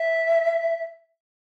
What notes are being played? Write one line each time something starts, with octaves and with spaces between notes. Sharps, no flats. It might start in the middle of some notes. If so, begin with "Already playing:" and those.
Already playing: E5